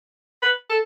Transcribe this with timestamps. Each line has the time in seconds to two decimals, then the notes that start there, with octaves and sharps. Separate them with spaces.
0.42 B4
0.70 A4